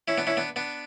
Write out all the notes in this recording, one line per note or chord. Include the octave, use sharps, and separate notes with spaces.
C#4 E4
B3 D4
C#4 E4
B3 D4
B3 D4